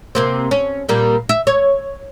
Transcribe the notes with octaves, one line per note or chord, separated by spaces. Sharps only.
C3 A#3 C4
C#4
A#2 G3 A#3
E5
C#5